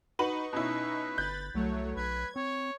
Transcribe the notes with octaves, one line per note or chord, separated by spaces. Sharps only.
D#4 F#4 B4 C#6 F#7
B2 C#4 E4 B4
G1 B5 F#6 G6 A6
C2 F#3 A3 C#5
B1 B4 G#6
C4 C#5